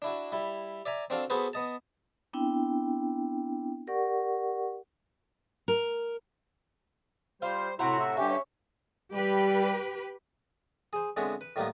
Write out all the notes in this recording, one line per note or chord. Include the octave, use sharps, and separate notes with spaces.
D4 E4 F#4
G3 E4
D5 E5 G#5 A#5
C4 D4 F#4 A4 F5
B3 F#4 G#4 A4 B4 C5
B3 D#5 A5
B3 C4 D4 E4 G5
G4 A#4 D5 F#5 C#6
A#4
G3 F4 C5
A2 C3 E4 F#4 F#5 A#5 C6
E5
G2 D3 C#4 G4 E5 G#5
C#4 C#5
G3 G4 B4
G#4 C5
D3 G#3 B3 C4 E4 C#5
B4
A2 D#3 G3 A#3 B3